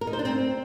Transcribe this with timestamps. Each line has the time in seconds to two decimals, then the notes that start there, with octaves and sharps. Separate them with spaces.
0.01 A#4
0.07 D#4
0.13 C5
0.19 D4
0.25 C4